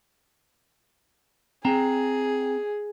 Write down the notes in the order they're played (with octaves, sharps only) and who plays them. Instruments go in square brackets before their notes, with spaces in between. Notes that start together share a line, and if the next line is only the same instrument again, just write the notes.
[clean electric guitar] C4 G5 A#5 [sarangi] G#4